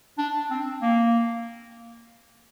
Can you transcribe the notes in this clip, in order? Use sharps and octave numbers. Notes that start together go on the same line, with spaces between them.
D4
C4
A#3